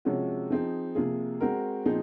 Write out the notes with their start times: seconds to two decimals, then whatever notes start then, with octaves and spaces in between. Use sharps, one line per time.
0.05 C3 F3 G#3 C#4 F#4
0.50 F3 C4 D#4 G#4
0.95 C3 F3 A#3 F4 G#4
1.41 G#3 C4 F#4 A#4
1.85 A#2 F3 C4 D#4 G#4